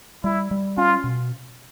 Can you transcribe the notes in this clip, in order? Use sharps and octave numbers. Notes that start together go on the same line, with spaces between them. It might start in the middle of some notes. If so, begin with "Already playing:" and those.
G3 E4
G3
C#4 F4
B2